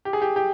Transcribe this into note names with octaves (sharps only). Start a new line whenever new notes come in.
G4
G#4
G4
G4